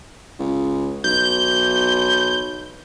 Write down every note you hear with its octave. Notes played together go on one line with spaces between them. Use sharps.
C#2
B1 G6